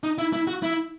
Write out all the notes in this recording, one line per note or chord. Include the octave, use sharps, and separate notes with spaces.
D#4
E4
E4
F#4
E4